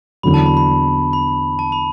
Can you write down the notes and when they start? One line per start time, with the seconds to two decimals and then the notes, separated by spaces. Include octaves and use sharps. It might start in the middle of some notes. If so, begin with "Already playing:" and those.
0.23 E2 D3 F#3 B5
0.34 A5
0.46 B5
0.57 B5
1.13 B5
1.59 A5
1.72 B5